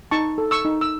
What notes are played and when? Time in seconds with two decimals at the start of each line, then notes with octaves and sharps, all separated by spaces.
0.11 D#4 A5 C#6
0.38 A4
0.51 C#6 E6
0.65 D#4
0.81 E6